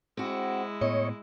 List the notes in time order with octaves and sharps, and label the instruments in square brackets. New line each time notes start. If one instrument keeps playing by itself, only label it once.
[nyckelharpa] G#3 E4 [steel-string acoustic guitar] C4 F#4
[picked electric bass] A2 B3 [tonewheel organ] C#5 [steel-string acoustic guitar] D#5